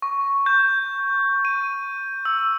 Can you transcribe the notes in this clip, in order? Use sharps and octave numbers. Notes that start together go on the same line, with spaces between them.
C#6
G6
D#7
E6